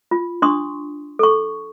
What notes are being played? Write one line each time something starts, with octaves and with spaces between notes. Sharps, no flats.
F4
D4 C6 C#6 D#6
A4 C#6